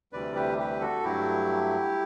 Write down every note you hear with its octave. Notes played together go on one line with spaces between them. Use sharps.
D2 C3 E3 G3 B4 D5
G4 B4
G4 B4
F#4 A4
G2 F#3 A3 E4 G4